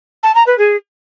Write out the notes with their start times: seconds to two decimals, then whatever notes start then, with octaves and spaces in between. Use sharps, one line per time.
0.23 A5
0.35 A#5
0.46 B4
0.58 G#4